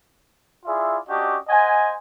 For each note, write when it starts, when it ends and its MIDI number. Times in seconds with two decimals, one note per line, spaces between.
0.66 0.98 64
0.66 0.98 65
0.66 0.98 68
0.66 0.98 74
0.66 0.98 76
1.08 1.37 61
1.08 1.37 62
1.08 1.37 66
1.08 1.37 67
1.08 1.37 74
1.08 1.37 75
1.49 1.96 72
1.49 1.96 75
1.49 1.96 78
1.49 1.96 80